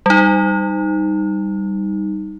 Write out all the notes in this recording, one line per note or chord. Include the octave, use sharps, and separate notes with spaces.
G3 D#4